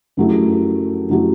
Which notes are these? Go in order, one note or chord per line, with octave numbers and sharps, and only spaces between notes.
F#2 F#3 A3 E4 G4
F#2 F#3 A3 E4 G4